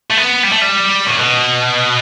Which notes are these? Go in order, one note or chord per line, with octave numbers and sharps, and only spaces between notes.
A3
B3
G3
A3
G3
A2
B2